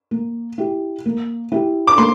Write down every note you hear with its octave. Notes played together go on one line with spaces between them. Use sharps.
A#3
E4 G4
A#3
E4 G4
D6
A#3 C6